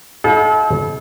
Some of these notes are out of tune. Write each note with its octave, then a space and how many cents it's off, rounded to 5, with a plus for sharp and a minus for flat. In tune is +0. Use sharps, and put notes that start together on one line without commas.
D#4 +45 A4 -40 F5 +45